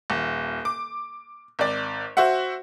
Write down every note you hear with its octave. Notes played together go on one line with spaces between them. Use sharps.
D#1
D6
G#1 D5
F#4 C5 E5 F#5